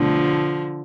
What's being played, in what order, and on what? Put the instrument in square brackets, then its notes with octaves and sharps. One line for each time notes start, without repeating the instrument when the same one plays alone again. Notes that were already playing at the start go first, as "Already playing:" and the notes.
Already playing: [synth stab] B2 A3 D4 [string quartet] D3 F3